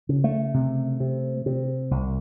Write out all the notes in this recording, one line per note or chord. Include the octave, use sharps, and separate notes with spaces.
C#3
A3
C3
C3
C3
C2